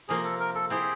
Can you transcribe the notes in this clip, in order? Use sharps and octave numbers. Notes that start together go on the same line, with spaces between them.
C3 F3 A#3 G#4
A4
A#4
A4
C4 E4 G4 G#4